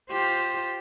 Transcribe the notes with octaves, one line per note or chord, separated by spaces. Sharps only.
F4 G4 C5